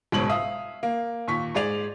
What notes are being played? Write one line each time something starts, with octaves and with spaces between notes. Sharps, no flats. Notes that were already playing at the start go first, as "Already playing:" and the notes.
F#1 G#2 B2 C#5 F#7
E5 F5 D#6
A#3
D#2 A#2 C#6 B6
G#2 G#4 D5 F7